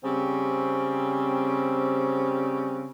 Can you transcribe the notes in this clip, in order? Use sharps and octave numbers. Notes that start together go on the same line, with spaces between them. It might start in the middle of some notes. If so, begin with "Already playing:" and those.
C#3 G3 C4